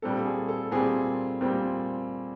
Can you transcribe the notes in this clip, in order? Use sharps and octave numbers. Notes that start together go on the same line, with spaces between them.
A#2 G3 C4 A4
G#4
A4
A#2 G3 C4 G#4
A#2 G3 C4